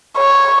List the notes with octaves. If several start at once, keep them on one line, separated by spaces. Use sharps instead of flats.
C#5